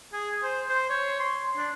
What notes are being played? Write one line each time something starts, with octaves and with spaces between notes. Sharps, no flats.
G#4
C5
C5
C#5
C6
D4